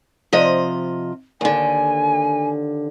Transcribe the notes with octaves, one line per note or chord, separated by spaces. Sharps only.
C3 F3 D#5
D#2 D3 G#5